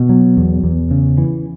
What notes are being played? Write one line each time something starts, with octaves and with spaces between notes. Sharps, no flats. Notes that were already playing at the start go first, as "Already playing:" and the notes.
Already playing: B2
F#3
E2
E2
C#3
E3